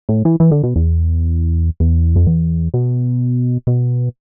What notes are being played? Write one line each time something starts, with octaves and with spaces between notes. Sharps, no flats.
A2
E3
E3
D3
B2
E2
E2
F2
E2
B2
B2